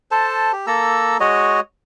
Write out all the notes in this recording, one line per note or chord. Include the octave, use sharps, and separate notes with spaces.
A4 C5 A5
G4
A#3 A4 A#5 E6
G#3 F#4 C#5 D#5